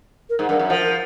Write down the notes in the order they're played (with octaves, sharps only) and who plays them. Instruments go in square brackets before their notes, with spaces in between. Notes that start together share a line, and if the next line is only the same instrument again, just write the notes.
[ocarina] A#4
[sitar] G#2
[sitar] G2 [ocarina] A#4
[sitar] F#2
[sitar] F3 [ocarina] A#4
[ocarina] A#4